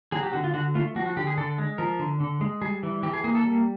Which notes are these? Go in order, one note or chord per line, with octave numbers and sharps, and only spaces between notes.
F#3 G#4
G4
D3 F#4
F4
D3 F#4
A3 F4
F3 F#4
F#4
D3 G4
G#4
D3 A4
G#3
F3 A#4
D3
D3
G#3
G3 G#4
E3
E3 G4
G#4
A#3 G#4
A4
G3